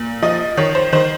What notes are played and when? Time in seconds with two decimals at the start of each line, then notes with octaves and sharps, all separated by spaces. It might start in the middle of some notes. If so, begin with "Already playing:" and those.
Already playing: A#2
0.22 F3 D#5
0.57 D#3 C#5
0.75 C5
0.93 D#3 C5